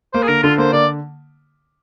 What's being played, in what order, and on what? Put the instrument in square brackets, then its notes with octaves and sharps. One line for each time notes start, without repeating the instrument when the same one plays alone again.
[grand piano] A#3 [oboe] C5
[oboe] G#4
[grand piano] D3 [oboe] A#4
[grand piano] D3 [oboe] F4
[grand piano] A#3 [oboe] C5
[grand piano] D3 [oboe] D5